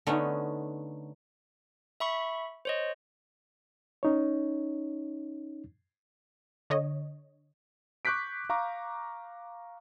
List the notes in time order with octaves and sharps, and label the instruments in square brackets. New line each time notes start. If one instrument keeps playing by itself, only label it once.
[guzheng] D3 A3 B3 C#4 D#4
[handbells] E5 B5 C#6
C5 C#5 D#5
[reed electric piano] C#4 D#4 C#5
[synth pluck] D3 C#5 D#5
[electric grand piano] C#6 D6 F#6 G6 B6 D7
F5 A#5 C#6 D6